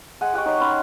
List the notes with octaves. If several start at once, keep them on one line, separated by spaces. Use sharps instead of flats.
G#3 F#5 G#5
G4 F#5 G5 C#6
D#4 C#5 D#6
C#4 B5 C6